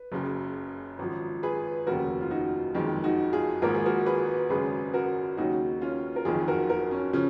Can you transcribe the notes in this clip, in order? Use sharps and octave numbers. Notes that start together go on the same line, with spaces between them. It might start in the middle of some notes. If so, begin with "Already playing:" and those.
Already playing: B4
F#1 F#2 C#3
G#1 F#2 F3
G#4 B4
F1 D#2 C#3 F#4 A#4
F4
D#4 F#4
F#1 F2 D#3 G#3
D#4 F#4
F4 G#4
G#1 G#2 F3 A#3 A#4
G#4
F#4 A#4
G#4 B4
G#1 F#2 C#3 G#3 G#4 B4
F#4 A#4
D#2 C#3 F#3 D#4 F#4
C#4 F4
A#4
F#1 F2 D#3 F4 G#4
F#4 A#4
F#4 A#4
C#4
C#3 F3 C#4